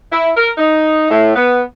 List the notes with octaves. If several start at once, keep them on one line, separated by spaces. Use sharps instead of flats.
E4
A#4
D#4
A2
B3